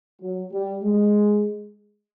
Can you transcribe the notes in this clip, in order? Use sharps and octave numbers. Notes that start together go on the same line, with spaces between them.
F#3
G3
G#3